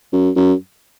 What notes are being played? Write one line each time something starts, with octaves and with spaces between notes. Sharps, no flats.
F#2
F#2